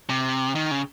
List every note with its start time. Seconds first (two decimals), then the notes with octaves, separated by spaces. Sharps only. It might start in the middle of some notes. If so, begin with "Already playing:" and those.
0.10 C3
0.55 D#3
0.71 C#3